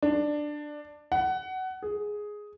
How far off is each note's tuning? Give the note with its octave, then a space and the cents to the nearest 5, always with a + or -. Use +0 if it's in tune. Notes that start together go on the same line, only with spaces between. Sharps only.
D4 +10
F#5 +20
G#4 +5